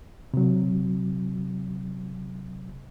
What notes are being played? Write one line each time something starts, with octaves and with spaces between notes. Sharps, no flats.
C3 F#3